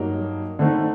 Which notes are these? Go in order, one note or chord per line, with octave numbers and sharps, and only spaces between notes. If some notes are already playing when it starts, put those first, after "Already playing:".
Already playing: G2 F#3 A#3 D#4
D3 A3 C4 D#4